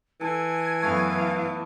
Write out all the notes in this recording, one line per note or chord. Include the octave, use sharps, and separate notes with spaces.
E3 A4 G#5
F#2 A3 B3 F5